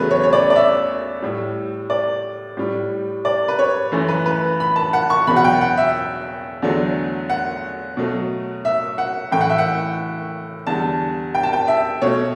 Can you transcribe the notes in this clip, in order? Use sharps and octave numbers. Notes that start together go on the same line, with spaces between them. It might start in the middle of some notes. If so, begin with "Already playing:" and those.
Already playing: E2 C#3 F#3 A3 B4
C#5
C#5
D5
D5
E5
A2 G3
D5
A2 G3
D5
B4
C#5
F#2 E3 A3
B4
B4
B5
A5
F#5
C#6
E2 B2 F#3 B5
F#5
G5
F#5
E5
E2 D3 F#3 A3
F#5
B2 F#3 A3
E5
F#5
A2 E3 A3 G5
F#5
E5
F#5
E2 D3 G3 A5
G5
A5
G5
E5
B2 A3 C#5